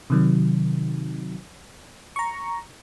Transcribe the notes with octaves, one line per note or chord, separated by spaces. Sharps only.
C3 D#3 F#3
A#5 C#6